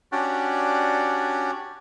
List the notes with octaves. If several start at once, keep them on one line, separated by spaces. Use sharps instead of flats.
C#4 D4 F#4 G4 D5